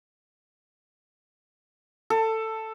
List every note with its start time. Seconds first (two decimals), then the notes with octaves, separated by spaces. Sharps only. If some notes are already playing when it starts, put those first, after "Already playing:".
2.10 A4